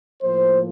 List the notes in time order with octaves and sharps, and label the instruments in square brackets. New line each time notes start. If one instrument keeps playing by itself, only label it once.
[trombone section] A2 F3 A#3 C5